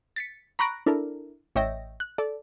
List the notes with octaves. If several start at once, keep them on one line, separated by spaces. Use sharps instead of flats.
A6 B6 C#7
A#5 B5 C#6 F#6 A#6 D7
D4 E4 A4 A#4
A1 C#5 D#5 E5 G5 A#6
F#6
A4 D5